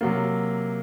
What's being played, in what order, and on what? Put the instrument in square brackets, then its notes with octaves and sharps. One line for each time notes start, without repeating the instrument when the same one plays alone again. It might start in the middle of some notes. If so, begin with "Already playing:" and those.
[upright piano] C3 F#3 A#3